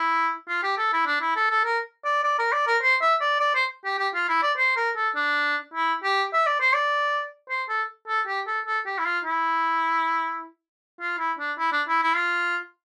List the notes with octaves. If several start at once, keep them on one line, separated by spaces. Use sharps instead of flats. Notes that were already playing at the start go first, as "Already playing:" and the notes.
Already playing: E4
F4
G4
A4
E4
D4
E4
A4
A4
A#4
D5
D5
A#4
D5
A#4
C5
E5
D5
D5
C5
G4
G4
F4
E4
D5
C5
A#4
A4
D4
E4
G4
E5
D5
C5
D5
C5
A4
A4
G4
A4
A4
G4
E4
F4
E4
F4
E4
D4
E4
D4
E4
E4
F4